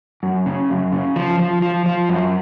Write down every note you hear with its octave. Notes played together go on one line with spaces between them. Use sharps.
F#2
C#3
F#2
C#3
F3
F3
F3
F3
F#2